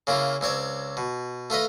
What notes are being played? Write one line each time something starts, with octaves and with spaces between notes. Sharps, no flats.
C#3 A#3 E4 F4
C#2 C4 C#5 D5
B2
A3 F4 B4 D#5